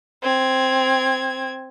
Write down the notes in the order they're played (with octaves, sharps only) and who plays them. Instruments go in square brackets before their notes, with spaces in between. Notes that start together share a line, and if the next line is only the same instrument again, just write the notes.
[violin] C4 G#6